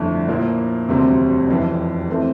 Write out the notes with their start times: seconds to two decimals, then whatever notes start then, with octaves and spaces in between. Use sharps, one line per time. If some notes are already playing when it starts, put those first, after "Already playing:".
Already playing: G1 F2 D3 A3 E4
0.28 A#2 F3 A#3 E4
0.88 E1 D2 C3 G3 C4
1.48 F1 F2 E3
2.10 E3 A3 C4